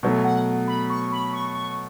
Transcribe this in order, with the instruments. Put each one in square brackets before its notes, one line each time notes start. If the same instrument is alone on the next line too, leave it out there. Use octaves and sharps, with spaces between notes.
[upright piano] B2 F#3 A3
[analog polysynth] F#5
B5
C#6
B5
C#6
C#6